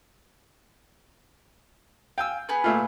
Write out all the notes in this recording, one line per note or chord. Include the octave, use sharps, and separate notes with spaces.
F5 G5 G#5 E6
B3 G#4 B4
A#2 A3 F4